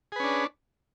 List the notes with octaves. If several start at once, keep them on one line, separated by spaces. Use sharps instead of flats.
C#4 D4 G#4 B4